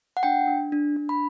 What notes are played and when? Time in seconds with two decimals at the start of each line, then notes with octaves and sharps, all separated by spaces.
0.17 F#5
0.23 D4 G5
0.47 D4
0.72 D4
0.96 D4
1.09 B5